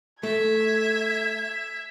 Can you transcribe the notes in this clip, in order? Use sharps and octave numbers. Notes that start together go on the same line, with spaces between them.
A3 E5 G#6